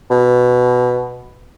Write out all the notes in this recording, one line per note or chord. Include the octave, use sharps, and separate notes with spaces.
B2